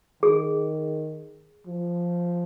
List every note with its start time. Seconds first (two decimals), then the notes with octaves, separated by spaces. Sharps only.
0.23 D#3 G#4
1.67 F3